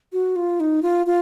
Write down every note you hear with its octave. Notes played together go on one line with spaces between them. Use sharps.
F#4
F4
D#4
F4
F4